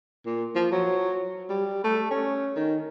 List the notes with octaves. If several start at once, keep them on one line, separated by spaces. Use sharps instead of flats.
A#2
F3
F#3
G3
A3
C#4
D#3